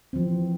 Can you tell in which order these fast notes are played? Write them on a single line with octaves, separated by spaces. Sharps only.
C4 F3 E3